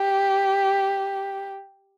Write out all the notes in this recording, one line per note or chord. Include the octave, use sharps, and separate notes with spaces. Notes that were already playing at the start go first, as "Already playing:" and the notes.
Already playing: G4